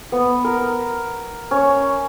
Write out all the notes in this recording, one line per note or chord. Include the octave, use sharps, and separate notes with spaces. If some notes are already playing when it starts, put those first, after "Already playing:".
B3
A#4
C#4